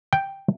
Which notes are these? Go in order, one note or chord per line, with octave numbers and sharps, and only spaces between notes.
G5